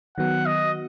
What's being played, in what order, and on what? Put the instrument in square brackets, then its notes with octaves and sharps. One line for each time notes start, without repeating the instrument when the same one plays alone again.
[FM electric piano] D#3 F#3 B3 F#4 [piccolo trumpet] F#5
[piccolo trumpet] D#5